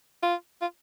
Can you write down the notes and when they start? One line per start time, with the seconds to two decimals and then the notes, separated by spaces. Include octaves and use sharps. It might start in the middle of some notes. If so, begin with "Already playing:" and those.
0.23 F4
0.61 F4